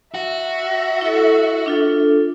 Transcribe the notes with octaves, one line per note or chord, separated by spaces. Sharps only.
F#4 E5
E4 A4
D4 F4 A4